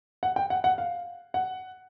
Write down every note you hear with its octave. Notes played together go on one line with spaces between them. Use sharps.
F#5
G5
F#5
F#5
F5
F#5